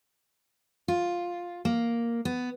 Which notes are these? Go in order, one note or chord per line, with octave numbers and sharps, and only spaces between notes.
F4
A#3
B3